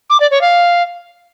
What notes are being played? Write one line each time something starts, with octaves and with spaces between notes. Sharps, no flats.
D6
D5
C#5
F5